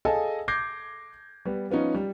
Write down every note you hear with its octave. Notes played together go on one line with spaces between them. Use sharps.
G#4 A4 D#5 F5 G#5 A5
D6 G6 G#6 A#6 C7
G3 B3
F3 B3 C#4 D#4
G3